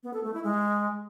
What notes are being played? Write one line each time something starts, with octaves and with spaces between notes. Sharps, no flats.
B3
A4
A3
E4
G#3